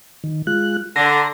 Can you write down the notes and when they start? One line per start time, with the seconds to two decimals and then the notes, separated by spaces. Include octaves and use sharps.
0.24 D#3
0.47 G#3 F4 F#6
0.96 D3 A#5 C6 A#6